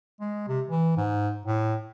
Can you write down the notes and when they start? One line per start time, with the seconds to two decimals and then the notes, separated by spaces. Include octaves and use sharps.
0.21 G#3
0.48 C3
0.69 E3
0.97 G#2
1.46 A2